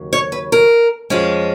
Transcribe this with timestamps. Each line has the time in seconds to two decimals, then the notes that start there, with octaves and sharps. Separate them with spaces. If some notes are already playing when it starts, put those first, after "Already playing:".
Already playing: D#2 C#3 F#3
0.13 C#5
0.32 B4
0.52 A#4
1.10 F2 F3 G#3 C#4